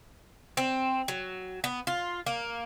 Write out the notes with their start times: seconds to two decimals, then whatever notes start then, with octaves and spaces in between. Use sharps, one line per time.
0.57 C4
1.08 F#3
1.64 B3
1.87 F4
2.26 A#3